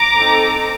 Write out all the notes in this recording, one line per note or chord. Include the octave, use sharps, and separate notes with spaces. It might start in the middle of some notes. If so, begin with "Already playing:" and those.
Already playing: A#5 D6
C4 D#4 A4